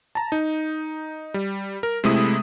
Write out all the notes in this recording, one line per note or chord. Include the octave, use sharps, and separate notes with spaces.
A5 A#5
D#4
G3
A#4
C3 G#3 A3 E4 D#6